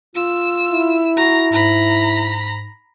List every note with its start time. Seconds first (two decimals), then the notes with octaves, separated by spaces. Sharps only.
0.15 F4 E6
0.71 E4
1.17 F#4 A#5
1.52 G#2 A#5 B5